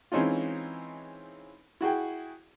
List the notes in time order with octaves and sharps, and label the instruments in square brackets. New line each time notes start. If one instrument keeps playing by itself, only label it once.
[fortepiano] E3 G#3 C4 C#4 D#4 F4
E4 F#4 G#4 G5